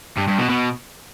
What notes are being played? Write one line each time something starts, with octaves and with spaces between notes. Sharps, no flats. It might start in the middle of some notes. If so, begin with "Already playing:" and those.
G2
G2
B2
B2